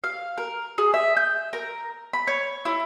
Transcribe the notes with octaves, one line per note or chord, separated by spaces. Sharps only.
F5
A#4
G#4
E5
G6
A#4
B5
C#5
E4